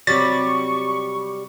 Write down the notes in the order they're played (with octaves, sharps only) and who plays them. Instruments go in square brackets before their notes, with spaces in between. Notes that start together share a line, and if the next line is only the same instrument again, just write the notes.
[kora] C3 F#3 [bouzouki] G3 [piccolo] C#6 [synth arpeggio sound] A6